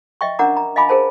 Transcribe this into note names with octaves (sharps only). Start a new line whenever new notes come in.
D#5 E5 G5 C#6
C#4 D4 A#4 F#5 A#5 D6
A#5
D#5 F5 G#5 B5 D6
G#4 A#4 C5 A5